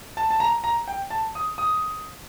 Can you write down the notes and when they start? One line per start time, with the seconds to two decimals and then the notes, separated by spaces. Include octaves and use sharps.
0.17 A5
0.31 A5
0.40 A#5
0.64 A#5
0.88 G5
1.10 A5
1.35 D#6
1.58 D#6